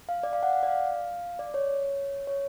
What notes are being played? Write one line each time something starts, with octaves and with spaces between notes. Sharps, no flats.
F5
D5
F5
F#5
F#5
D5
F5
D5
C#5
C#5